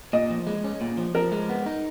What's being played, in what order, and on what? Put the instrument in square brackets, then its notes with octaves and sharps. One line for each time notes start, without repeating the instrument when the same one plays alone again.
[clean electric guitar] A#2 [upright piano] D#5
[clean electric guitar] F3
G#3
C#4
A#2
F3
[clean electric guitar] F3 [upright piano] A#4
[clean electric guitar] G#3
B3
D#4